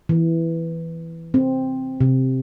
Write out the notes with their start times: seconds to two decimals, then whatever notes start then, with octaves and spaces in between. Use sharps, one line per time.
0.09 E3
1.34 C4
2.01 C3